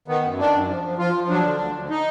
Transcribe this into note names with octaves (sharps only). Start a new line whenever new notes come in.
D#3 B3
F#2
D#3 D4
F#2
F3
F3
F3 F4
F3
F#3 D4
D3
D2
D2
D#4